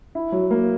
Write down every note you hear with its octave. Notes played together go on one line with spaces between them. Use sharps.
E4
F#3
A#3